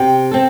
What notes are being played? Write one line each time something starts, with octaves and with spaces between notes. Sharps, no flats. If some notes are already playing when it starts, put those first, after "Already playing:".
Already playing: C3 G5
C4 A4